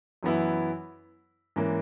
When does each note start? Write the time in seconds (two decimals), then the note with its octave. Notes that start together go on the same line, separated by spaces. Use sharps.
0.23 F#2 E3 B3 E4
1.56 G#2 E3 A#3 C#4